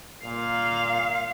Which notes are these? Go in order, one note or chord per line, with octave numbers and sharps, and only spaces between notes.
A#2 F5